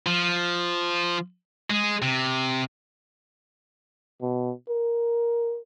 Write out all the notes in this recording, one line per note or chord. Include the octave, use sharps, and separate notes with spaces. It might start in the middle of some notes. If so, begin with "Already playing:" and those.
F3
G#3
C3
B2
A#4